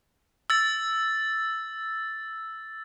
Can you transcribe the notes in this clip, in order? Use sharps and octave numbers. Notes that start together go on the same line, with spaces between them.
E6 A6